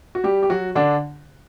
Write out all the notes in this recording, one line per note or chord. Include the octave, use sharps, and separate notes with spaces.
F#4
G3 G4
G4
F#3 F#4
D3 D4